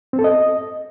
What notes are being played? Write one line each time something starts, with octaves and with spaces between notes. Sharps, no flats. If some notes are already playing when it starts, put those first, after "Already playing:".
C4
A4
D#5